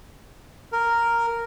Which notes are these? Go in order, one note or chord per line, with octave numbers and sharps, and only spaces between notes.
A#4